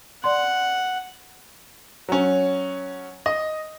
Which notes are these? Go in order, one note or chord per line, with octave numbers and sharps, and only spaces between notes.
D5 F#5 C6
F#3 C#4
D#5